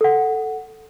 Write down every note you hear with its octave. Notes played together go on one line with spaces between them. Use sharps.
A4 F#5